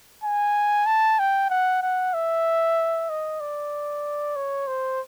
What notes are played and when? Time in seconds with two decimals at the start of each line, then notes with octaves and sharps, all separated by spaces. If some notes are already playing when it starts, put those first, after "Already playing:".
0.24 G#5
0.86 A5
1.19 G5
1.50 F#5
1.82 F#5
2.14 E5
3.09 D#5
3.40 D5
4.36 C#5
4.67 C5